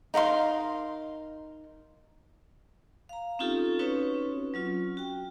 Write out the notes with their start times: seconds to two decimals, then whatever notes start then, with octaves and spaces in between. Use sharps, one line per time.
0.14 D#4 A#4 F5 C6
3.09 F5 A#5
3.39 C4 C#4 D#4 F4 G4 A4
3.79 C4 C#4 D#4 F#4 B4 C#5
4.54 F#3 C#4 F4
4.97 F#4 G5